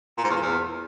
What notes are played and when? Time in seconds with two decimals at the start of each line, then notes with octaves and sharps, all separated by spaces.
0.18 A#2
0.24 G#2
0.30 E2
0.36 A#2
0.42 E2